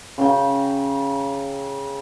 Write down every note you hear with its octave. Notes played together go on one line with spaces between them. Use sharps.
C#3 G5 A#5